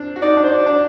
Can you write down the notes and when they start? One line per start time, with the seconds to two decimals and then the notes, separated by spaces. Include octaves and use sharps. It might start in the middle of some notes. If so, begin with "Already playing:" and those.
Already playing: C4 D4
0.16 F#4
0.22 D#4 D5
0.37 D4
0.44 C5
0.51 F#4 D5
0.66 D4